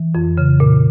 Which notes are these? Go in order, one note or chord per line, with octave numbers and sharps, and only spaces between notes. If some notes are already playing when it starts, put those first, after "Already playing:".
Already playing: E3
F2
C#3
A#2